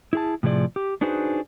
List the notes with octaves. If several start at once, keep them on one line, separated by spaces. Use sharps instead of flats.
E4 G#4 A5
A2 C3 F3 G#4 D5
G4
D4 D#4 F#4 G#4 B4 C5